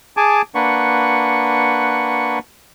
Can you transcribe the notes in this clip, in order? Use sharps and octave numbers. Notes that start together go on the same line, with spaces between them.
G#4 G#5 A5 D6
A#3 D4 B4 F#5 C#6